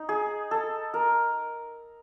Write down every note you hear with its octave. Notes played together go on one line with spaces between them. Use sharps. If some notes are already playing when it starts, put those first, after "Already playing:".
Already playing: D#4
G#4
A4
A#4